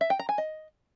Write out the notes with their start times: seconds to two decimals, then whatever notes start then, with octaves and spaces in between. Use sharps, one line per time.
0.01 E5
0.10 G5
0.19 A#5
0.29 G#5
0.38 D#5